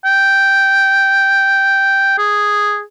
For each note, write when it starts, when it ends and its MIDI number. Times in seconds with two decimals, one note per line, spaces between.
0.05 2.16 79
2.18 2.82 68